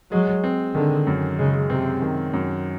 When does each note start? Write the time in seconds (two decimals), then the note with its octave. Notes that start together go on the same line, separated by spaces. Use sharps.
0.11 F#3 G#3
0.44 C4
0.75 D3 D#3
1.07 F#2
1.39 C#3 G#3
1.70 C3 C4
2.02 D#3
2.33 F#2